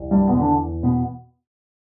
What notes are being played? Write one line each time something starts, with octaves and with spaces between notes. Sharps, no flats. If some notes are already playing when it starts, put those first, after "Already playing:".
Already playing: C2
G2 G3
E2 B2 D3 B3
D3 D4
B2 B3